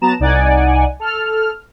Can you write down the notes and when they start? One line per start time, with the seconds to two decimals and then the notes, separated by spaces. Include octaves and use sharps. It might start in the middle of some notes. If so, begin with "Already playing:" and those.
0.01 F#3 B3 A5 A#5 E7
0.19 C2 D#4 D5 F#5 G#5
1.00 A4 F6